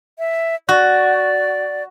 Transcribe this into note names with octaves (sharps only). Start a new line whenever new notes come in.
E5
F#4 D5